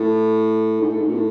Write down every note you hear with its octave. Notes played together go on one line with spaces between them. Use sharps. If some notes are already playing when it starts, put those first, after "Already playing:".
Already playing: A2
G#2
A2
G#2
A#2
A2